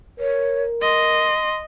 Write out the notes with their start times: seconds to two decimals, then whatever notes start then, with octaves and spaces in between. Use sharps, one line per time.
0.20 A#4 C#5
0.82 D#5 C6